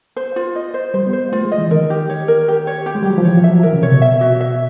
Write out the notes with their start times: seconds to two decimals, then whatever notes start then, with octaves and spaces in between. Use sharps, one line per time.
0.16 C5
0.36 F4
0.56 D#5
0.74 C5
0.94 G3 C5
1.07 B3
1.13 C5
1.32 A3 F4
1.45 G#3
1.51 D#5
1.58 E3
1.71 D#3 A#4
1.90 G4
2.09 C#5
2.28 A#4
2.48 G4
2.67 C#5
2.86 G4
2.95 G#3
3.03 G3
3.05 F#3 G4
3.18 F3
3.25 E3 C#5
3.37 F3
3.44 E5
3.50 F#3
3.63 E3 A#4
3.73 C#3
3.83 C3 C#5
3.92 B2
4.02 E5
4.21 F#4
4.40 E5